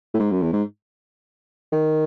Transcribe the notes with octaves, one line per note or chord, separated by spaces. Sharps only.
A2
G#2
F#2
E2
G#2
D#3